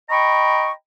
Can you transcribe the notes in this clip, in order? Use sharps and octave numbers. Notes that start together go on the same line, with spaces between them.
D#5 G5 A#5 B5 C#6